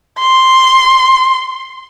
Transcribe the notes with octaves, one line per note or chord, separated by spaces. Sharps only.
C6